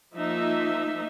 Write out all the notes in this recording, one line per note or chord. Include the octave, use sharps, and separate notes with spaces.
F3 A#3 D#4 E5